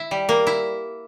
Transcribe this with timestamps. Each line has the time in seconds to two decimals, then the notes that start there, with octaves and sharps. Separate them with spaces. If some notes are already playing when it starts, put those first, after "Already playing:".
Already playing: E4
0.11 G3
0.29 A#3
0.47 E4